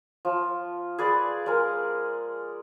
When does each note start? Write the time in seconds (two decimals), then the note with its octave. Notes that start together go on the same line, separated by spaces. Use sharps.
0.25 F3
0.98 G#4 B4 D5
1.46 G#3 A#4